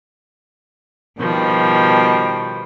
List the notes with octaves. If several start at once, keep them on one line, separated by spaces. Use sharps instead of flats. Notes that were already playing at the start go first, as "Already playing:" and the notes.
B2 D#3 F3 G3